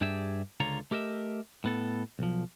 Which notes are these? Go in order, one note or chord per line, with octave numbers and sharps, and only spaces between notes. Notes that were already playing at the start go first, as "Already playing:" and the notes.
G2 D4 G4 G#4 E5
C#2 D3 F4 C#5 A#5
A3 G4 A#4 D#5 E5
A2 B3 A4
B1 F3